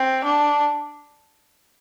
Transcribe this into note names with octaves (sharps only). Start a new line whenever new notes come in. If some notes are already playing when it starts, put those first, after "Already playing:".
Already playing: C4
D4